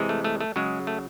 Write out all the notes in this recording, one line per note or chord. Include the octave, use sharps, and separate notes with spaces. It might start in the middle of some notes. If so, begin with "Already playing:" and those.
Already playing: C3 E3 G#3
A3
A3
A3
C#3 F#3 G#3
A3